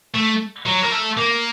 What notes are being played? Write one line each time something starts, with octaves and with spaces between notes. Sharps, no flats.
A3
F#3
A#3
A3
A#3